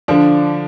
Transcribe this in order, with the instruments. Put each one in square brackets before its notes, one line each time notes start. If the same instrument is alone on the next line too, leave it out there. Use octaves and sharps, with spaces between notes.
[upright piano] D3 F3 [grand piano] D4